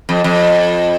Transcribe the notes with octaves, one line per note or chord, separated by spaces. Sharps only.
F2
F2